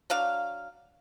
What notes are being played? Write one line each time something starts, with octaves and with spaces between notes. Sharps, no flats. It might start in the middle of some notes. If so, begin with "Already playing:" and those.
F#3 D4 F5